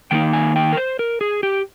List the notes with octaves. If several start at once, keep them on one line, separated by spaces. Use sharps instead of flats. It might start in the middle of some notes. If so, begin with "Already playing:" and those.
D#3 A#3 D#4 G5
G#5
G5
A#4
C5
A#4
G#4
G4